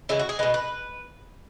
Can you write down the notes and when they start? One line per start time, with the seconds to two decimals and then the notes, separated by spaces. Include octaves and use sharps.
0.09 C#3 E3 G#3 E4
0.19 F#4
0.29 G#4
0.39 B2 G#3 B4
0.54 B4